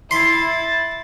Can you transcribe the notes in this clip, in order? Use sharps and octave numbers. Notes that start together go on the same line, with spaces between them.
E4 B5 C6 A6